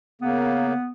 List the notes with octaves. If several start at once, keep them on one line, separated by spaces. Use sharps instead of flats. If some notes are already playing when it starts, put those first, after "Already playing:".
C#3 A#3 B3